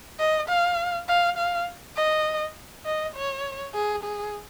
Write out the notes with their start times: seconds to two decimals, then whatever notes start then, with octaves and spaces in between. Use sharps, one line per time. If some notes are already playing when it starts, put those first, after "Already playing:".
0.19 D#5
0.49 F5
1.09 F5
1.38 F5
1.96 D#5
2.85 D#5
3.15 C#5
3.74 G#4
4.04 G#4